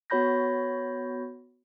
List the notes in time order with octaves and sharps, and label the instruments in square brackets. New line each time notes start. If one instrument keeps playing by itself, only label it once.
[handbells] B3 F#4 C#5 B5 G6 A#6